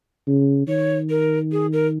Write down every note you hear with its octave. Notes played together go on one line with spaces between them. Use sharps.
C#3
D#3 C#5
A#4
G#4
A#4